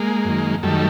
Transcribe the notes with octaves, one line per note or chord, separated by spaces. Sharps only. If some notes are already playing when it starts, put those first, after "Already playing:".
Already playing: G#3 A#3
F#2 D#3
F#2 D#3 G3 A3